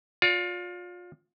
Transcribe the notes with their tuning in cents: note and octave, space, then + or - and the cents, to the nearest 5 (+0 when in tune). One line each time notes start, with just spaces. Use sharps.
F4 +30 D5 -30